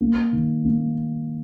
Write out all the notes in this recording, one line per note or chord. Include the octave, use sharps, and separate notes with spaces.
A#3
D#3
A#3